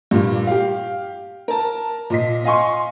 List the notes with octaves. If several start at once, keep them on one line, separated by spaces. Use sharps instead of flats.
G2 A#2 A#3
G4 F5
A#4 A5
A#2 D#5 B6
D#5 F5 G#5 C6 C#6